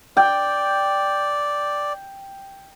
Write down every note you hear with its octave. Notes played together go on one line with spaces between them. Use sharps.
D5 G5